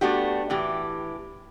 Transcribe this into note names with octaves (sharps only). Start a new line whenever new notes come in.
A3 B3 D4 F#4 G4
A2 E3 G4